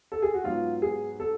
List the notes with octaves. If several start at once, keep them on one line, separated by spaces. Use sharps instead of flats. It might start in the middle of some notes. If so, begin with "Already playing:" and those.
A4
G#4
F#4
G#2 F#3 B3 F4
G#4
A4